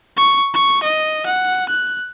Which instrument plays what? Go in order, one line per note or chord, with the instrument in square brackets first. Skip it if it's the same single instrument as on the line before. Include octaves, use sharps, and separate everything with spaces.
[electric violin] C#6
C#6
D#5
F#5
F#6